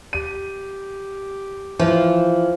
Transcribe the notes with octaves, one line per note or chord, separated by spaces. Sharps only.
G4 D#7
E3 F3